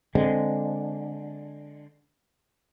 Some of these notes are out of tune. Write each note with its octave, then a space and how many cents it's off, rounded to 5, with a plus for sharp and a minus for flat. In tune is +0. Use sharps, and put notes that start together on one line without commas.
D3 +0 G#3 -10 C4 +0